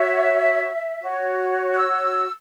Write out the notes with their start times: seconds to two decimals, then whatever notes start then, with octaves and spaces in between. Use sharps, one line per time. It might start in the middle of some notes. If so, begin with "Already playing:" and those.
Already playing: F#4 C#5 E5
1.00 F#4 C#5
1.72 F#6
1.78 E6